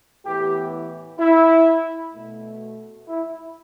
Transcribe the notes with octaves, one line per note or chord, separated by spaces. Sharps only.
A2 E3 B3 G4
E4
B2 A3
E4